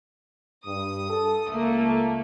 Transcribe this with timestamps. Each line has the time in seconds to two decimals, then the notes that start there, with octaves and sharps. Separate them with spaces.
0.66 G2 D#6
1.10 A4
1.48 C#2 A3 A#3